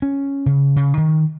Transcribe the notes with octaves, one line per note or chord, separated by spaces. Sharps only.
C#4
C#3
C#3
D#3